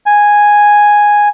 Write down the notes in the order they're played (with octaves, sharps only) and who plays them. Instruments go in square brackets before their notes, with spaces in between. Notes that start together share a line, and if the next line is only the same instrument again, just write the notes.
[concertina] G#5